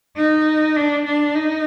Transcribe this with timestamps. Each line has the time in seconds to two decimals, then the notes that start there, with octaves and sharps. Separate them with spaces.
0.17 D#4
0.76 D4
1.05 D4
1.35 D#4